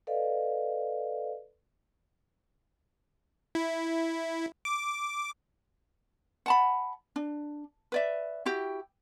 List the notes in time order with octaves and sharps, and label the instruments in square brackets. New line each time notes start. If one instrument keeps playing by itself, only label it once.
[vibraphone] A4 B4 D5 D#5 F5
[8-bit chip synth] E4
D6
[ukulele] F#5 A5 B5
D4
B4 D5 E5
E4 F#4 G4 G5